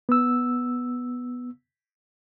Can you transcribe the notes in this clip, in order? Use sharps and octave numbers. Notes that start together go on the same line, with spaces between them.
B3 E6